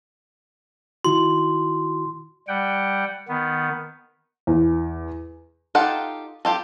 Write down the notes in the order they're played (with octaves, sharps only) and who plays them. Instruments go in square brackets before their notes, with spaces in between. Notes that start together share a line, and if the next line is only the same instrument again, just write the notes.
[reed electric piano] D#3 E4 F#4 [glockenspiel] C6
[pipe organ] G3 F#5 G5
D#3 B3
[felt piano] E2
[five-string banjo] D#4 F4 G4 A4 F#5
F4 G4 A4